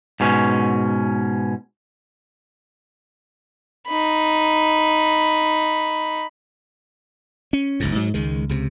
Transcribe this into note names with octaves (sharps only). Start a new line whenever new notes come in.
G#2 B2 C#4
D#4 B5
C#4
F#1 C#2 G#2
G#2 F#3
C#2 D#3 G#3
C#2 C3